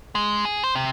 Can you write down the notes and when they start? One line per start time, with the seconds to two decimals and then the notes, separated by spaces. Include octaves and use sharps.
0.15 G#3
0.45 G#4
0.64 C5
0.75 C3